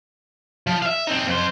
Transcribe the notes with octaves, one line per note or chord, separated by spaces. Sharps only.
F3
E5 F5
C4 D#4
F2 C5